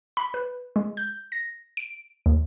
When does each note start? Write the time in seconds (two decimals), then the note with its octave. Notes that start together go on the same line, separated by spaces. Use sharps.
0.17 B5
0.34 B4
0.76 G#3
0.97 G6
1.32 A#6
1.77 D7
2.26 D#2